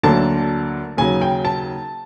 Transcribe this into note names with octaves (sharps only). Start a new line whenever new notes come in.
D2 D3 F#3 A#3 A5
D#2 C#3 F#3 G#5
G5
A5